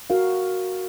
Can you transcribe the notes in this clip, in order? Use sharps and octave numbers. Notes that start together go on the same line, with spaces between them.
F#4 A#4 F5